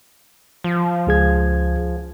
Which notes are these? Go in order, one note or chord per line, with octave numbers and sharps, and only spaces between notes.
F3
C#2 G#4 G#6